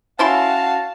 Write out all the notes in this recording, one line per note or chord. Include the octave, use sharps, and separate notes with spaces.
C#4 E4 F#4 F5 A5 C6